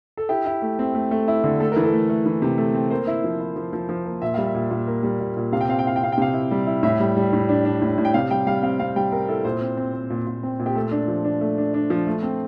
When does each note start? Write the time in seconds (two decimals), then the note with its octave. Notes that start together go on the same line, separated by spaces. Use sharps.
0.17 A4
0.29 E4 G4
0.46 E4
0.62 A3
0.79 C4
0.94 A3
1.11 A3
1.28 E4
1.44 D3
1.60 A3 A4
1.72 E3 A#4
1.84 A4
1.93 A3
2.09 A3
2.26 E3
2.42 C3
2.58 A3
2.74 C4
2.90 A#3 C5
3.07 E4
3.24 F3
3.40 E4
3.56 F3
3.73 F3
3.89 F3
4.05 A#3
4.22 A#2 E5
4.34 G3 F5
4.46 E5
4.55 A#2
4.71 A#2
4.87 A#3
5.03 G3
5.20 A#2
5.37 A#2
5.52 C3 F5
5.61 G5
5.69 C4 F5
5.79 G5
5.85 E4 F5
5.96 G5
6.02 C4 F5
6.12 G5
6.18 C3 F5
6.34 E4
6.51 G3
6.67 E4
6.83 A2 E5
7.00 G3
7.17 G3
7.33 A2
7.49 D4
7.65 D4
7.82 A2
7.98 A2
8.05 G5
8.14 C3 F5
8.31 G3 G5
8.47 G3 F5
8.63 C4 F5
8.79 C4 F5
8.96 G3 G5
9.12 C4 A#4
9.28 E4 A4
9.45 A#2 C5
9.61 C4
9.77 C4
9.93 C4
10.10 A#2
10.27 A#2
10.43 C4
10.60 A#2
10.66 G4
10.76 A3 A4
10.92 D4
11.08 F3
11.25 D4
11.41 A3
11.58 D4
11.74 D4
11.90 F3
12.07 A3
12.23 C4